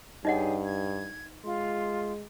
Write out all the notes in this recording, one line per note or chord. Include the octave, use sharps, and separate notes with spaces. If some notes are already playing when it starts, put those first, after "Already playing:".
G2 D#4 G4 G#4 C#5 D#5 F#5
G#6
G#3 F4 C6